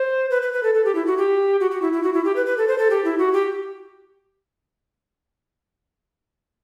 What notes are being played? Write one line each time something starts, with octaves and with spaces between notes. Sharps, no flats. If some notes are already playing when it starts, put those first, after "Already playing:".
Already playing: C5
B4
B4
B4
A4
A4
G4
E4
F#4
G4
F#4
F#4
E4
E4
F#4
E4
G4
B4
B4
A4
C5
A4
G4
E4
F#4
G4